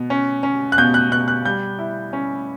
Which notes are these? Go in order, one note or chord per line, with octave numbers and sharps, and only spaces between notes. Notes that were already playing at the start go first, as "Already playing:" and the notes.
Already playing: B2
C#4
C#4
F#6
B2 G6
F#6
B2 F#6
F#6
G3 G6
E4
C#4